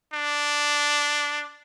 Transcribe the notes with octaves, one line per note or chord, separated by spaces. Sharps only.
D4